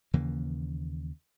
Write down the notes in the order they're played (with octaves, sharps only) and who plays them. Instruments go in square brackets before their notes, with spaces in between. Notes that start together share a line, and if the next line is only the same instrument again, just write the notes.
[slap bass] D#2 C#3 E3 A#3